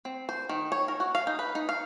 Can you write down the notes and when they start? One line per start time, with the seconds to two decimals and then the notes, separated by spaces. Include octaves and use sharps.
0.05 C4
0.29 C5
0.49 D#3
0.72 C#5
0.88 A#4
1.00 F#4
1.15 F5
1.27 D#4
1.39 B4
1.55 D#4
1.69 F5